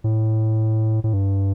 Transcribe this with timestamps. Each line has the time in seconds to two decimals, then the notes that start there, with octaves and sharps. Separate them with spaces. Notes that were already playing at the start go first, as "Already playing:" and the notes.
0.04 A2
1.04 A2
1.13 G2